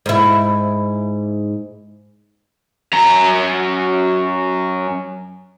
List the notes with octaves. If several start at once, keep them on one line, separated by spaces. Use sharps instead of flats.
G#2 E4
F#2 A#5